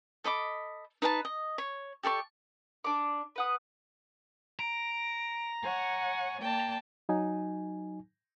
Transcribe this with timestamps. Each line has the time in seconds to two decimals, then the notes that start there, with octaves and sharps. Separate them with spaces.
0.24 A4 D#5 B5 D6
1.02 D#4 B4 G5 A5
1.25 D#5
1.58 C#5
2.03 G4 A4 D5 C#6
2.84 D4 D5 D6
3.36 B4 F#5 D#6
4.59 A#5 D7
5.63 C#5 F#5 G#5
6.40 A#3 D5 G5 A5
7.09 F#3 D#4 G#5